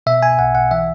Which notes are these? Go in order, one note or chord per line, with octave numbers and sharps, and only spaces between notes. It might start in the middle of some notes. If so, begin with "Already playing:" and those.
B2 E5
G#5
B1 F#5
F#5
E3 E5